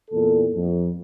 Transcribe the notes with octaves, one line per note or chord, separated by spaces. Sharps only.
E2 A#2 A4
F2